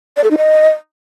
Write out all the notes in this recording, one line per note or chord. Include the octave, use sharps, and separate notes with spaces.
D5
A4
D#4
D#5